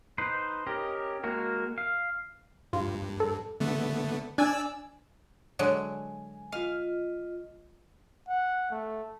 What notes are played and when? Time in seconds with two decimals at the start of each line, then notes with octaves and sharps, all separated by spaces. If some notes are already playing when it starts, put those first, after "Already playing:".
0.18 D#4 B4 C5
0.66 C#4 G4 A#4 D#5
1.24 G#3 A#3 F#4 A#4
1.78 F5
2.73 G2 F4
3.20 A4
3.60 D3 A3 B3
4.38 D4 D5 G#5 E6
5.59 D3 F#3 G#3 G#5
6.52 F4 D#5 F5
8.29 F#5
8.71 A3